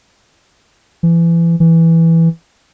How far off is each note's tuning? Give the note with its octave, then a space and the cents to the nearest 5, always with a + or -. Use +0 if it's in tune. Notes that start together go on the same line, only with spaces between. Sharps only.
E3 +30
E3 +0